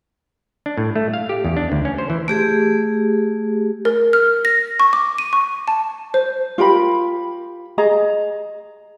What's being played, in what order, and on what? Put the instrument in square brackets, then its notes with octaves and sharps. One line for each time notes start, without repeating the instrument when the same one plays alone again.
[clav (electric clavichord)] D4
A2
A3
F5
G4
E2
D4
D2
C#4
C5
E3
[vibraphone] A3 G4 G#4
[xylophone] A#4
F6
A#6
C#6
D6
D#7
C#6
A5
C5
[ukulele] F4 G4 A#4 B5
G#4 D#5 A#5